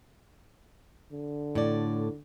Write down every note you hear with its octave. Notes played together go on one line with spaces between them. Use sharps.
D3
A2 D5